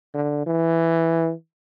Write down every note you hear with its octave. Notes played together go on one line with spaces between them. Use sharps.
D3
E3